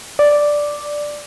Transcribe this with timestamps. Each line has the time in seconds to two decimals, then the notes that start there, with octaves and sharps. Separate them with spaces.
0.19 D5